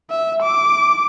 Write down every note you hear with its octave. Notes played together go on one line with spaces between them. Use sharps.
E5
D6